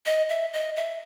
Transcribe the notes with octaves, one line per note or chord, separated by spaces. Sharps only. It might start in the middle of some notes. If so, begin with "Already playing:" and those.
D#5
E5
D#5
E5